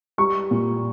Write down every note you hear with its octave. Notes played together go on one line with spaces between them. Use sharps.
G3 C#6
A#2